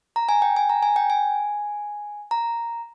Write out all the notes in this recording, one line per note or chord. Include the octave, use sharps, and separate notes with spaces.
A#5
G#5
G5
G#5
A#5
G#5
G5
G#5
A#5